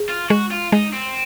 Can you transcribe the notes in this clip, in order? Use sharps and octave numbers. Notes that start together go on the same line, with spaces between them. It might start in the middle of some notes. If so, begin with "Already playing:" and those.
Already playing: G#4
F4
G#3 F#4
F4
G#3 D#4
C4